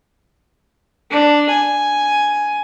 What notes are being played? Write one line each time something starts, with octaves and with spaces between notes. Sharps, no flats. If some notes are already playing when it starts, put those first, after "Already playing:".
D4
G#5